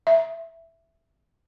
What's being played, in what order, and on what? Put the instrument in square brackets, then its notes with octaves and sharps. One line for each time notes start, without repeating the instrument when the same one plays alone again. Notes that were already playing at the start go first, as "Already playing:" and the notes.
[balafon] E5